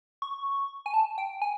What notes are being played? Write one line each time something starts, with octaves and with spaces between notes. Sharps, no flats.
C#6
G#5
A5
G5
G#5